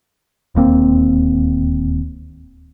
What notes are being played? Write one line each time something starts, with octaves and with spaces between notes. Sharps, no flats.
D1 D#2 A#3 C4